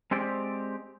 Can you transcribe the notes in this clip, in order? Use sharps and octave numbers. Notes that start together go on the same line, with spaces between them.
G#3 C4 G4 D5